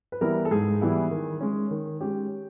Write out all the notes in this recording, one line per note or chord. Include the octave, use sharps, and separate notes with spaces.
B4
E3 G3 B3 E4 A#4
A4
G#2 G#4
E3 G3 B3 E4
D#3
G#3 C#4
D#3
G#3 C#4 G4